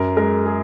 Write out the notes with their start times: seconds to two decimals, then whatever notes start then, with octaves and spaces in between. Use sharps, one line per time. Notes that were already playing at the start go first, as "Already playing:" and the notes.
Already playing: F#2 A#4
0.17 G#3 A#4
0.46 G#4